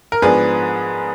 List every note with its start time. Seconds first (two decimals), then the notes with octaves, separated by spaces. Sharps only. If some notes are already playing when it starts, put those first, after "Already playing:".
0.12 A#4
0.22 G#2 F3 B3 D4 G#4 B4